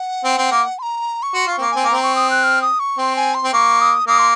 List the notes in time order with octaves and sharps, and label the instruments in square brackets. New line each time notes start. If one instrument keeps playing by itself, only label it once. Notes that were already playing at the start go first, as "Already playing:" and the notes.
Already playing: [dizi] F#5
[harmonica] C4
C4
A#3
[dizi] C6
A#5
C#6
[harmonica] F#4 [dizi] C6
[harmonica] F4
[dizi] C#6
[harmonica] C4
A#3
[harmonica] C4 [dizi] G#5
[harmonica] A#3
[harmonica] C4 [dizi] A#5
[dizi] C#6
D#6
F#6
F6
D#6
C#6
[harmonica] C4 [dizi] C6
[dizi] G#5
C6
[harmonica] C4
[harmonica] A#3 [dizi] C#6
[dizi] D#6
[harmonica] A#3 [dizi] D#6
[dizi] C6